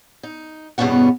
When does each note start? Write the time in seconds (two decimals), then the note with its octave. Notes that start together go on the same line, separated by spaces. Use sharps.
0.23 D#4
0.78 E2 G2 B2 B3 C#4 F#5